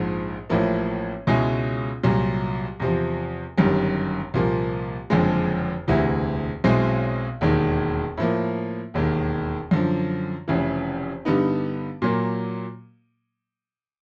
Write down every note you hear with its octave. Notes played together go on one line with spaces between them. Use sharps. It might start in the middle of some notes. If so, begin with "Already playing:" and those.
Already playing: A#1 G#2 F3
A1 A2 F3 A#3
C#2 B2 G#3 C#4 E4
C2 A#2 F#3
E2 C3 F3
G1 F#2 D#3 G3
C2 A#2 F3 A#3
F#1 F2 D3 F3 G#3
E1 D2 C3 E3
B1 B2 G#3 C4 E4
E1 D#2 D#3
A2 F3 A#3
E1 D#2 D#3
F#2 D3 F3
F1 F2 C#3 E3
G2 D3 G3 B3 D#4
A#2 F#3 A#3